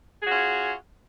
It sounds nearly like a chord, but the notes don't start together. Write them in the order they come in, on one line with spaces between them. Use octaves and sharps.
G#4 F#4 F4 C#4